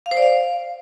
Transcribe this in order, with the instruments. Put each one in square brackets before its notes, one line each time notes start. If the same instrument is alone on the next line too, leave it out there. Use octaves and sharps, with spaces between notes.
[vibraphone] F5
C5
D5
F5